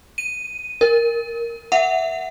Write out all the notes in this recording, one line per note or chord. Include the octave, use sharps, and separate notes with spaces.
D#7
A#4
E5 F#5